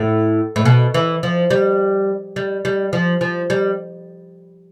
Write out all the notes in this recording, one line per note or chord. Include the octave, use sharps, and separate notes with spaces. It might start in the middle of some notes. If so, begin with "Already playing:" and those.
Already playing: A2
A2
B2
E3
F3
G3
G3
G3
F3
F3
G3